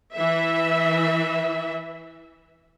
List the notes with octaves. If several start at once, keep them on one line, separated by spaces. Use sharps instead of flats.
E3 E5